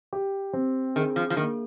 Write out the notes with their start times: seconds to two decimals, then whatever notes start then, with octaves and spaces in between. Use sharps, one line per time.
0.13 G4
0.53 C4
0.96 D#3 G#4
1.16 F3
1.30 F3
1.37 D#3 A#3